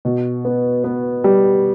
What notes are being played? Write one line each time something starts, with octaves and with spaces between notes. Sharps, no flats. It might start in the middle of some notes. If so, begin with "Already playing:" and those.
B2
B3
B3
G3